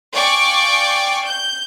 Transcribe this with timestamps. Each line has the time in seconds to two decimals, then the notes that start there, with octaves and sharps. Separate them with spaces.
0.13 D5 F5 G5 G#5 C#6 D6
1.25 G6